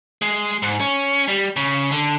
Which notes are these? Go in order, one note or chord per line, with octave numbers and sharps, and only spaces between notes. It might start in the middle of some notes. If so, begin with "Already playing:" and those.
G#3
G#2
C#4
G3
C#3
D3